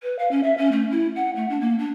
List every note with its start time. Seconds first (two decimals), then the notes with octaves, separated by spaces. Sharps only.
0.02 B4
0.18 F5
0.31 C#4
0.43 E5
0.57 C#4
0.71 A3
0.90 E4
1.15 F#5
1.35 A3
1.49 D4
1.60 A#3
1.78 D4